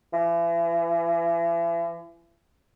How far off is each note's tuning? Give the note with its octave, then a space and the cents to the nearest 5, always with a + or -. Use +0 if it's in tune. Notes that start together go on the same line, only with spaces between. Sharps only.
E3 +40